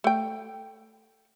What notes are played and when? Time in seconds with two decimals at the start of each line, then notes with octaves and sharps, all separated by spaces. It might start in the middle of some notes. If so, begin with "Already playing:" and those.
0.04 A3 G5